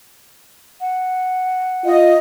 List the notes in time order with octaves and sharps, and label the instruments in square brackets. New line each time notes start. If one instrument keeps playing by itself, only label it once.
[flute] F#5
[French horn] F4 [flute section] D#5